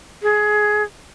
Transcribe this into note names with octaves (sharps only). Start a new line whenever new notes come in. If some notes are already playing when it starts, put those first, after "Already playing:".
G#4